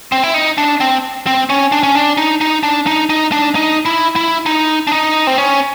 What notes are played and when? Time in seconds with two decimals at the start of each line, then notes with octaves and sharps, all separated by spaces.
0.12 C4
0.23 E4
0.34 D#4
0.58 D4
0.80 C4
1.27 C4
1.50 C#4
1.72 D4
1.83 C#4
1.95 D4
2.17 D#4
2.41 D#4
2.63 D4
2.87 D#4
3.10 D#4
3.32 D4
3.55 D#4
3.86 E4
4.16 E4
4.46 D#4
4.87 D4
4.92 D#4
5.27 C4
5.38 C#4